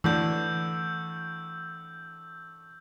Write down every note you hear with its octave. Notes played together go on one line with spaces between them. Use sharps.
A2 D3 E3 E6 G6